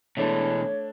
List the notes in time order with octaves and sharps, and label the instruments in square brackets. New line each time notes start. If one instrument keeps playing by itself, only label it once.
[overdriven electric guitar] B2 E3 [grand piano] A3 D4 A5 [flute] C#5